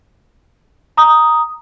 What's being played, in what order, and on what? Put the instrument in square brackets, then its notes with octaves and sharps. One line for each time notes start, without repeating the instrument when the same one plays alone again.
[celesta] A#5 D#6